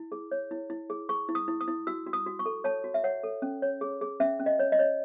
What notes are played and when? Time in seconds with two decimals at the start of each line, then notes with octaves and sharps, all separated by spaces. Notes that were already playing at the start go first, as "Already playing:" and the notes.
Already playing: E4
0.12 G#4
0.31 C#5
0.51 E4
0.70 E4
0.90 G#4
1.09 G#4 C#6
1.29 E4
1.35 D#6
1.48 E4
1.61 D#6
1.68 E4
1.87 F#4 E6
2.06 F#4
2.13 D#6
2.26 F#4
2.39 C#6
2.46 A4
2.64 C#5 A5
2.84 F#4
2.94 E5
3.04 C#5 F#5
3.23 A4
3.42 C#4
3.62 C#5
3.81 G#4
4.01 G#4
4.20 C#4 E5
4.39 C#4
4.46 D#5
4.59 C#5
4.72 D#5
4.79 C#5